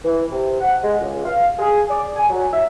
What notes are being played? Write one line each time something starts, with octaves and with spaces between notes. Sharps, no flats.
E3
C3
F#5
G#3
C#2
F5
G#4
D5
G#5
F#3
E5